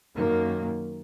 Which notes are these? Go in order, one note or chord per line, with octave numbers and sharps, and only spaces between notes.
F#2 D#3 A#3